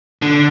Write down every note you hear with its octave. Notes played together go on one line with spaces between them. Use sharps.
D3